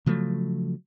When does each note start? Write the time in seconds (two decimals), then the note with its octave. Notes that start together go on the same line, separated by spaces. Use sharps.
0.06 C#3 F3 F#3 A3